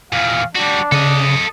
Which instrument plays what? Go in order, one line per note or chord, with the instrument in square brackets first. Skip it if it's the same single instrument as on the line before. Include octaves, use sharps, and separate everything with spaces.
[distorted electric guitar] E2 A#2 [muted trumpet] F5
[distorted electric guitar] G3 F#4 [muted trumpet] D4
[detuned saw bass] C#3 [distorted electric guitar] A4 D#5